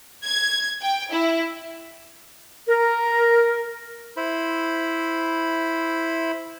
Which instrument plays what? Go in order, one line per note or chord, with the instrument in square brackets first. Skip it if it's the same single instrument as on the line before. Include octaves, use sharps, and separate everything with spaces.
[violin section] G#6
G5
E4
[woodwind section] A#4
[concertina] E4 C5 B5